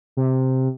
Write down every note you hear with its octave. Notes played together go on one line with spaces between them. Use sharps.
C3